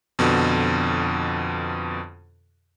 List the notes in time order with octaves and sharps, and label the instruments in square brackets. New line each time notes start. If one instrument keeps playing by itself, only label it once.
[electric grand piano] F2 B2 D3